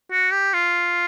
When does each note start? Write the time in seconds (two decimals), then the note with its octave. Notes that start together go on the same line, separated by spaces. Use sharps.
0.11 F#4
0.33 G4
0.54 F4